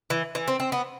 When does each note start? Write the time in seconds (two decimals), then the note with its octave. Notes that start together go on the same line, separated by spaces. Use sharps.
0.10 E3
0.35 E3
0.48 C4
0.60 C4
0.72 B3